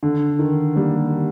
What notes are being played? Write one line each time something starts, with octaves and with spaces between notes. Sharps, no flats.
D3
D#3
G3 A#3